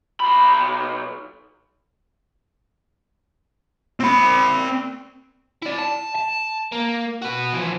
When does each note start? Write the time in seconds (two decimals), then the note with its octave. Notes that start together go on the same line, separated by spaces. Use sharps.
0.20 B1 B5
4.00 C4 B5
5.62 E4 D5
5.78 A5
6.15 A5
6.72 A#3
7.22 F#4 B4
7.53 E3 F3